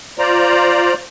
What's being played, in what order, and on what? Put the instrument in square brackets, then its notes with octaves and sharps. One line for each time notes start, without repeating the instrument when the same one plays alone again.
[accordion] F4 C5 D5 A#5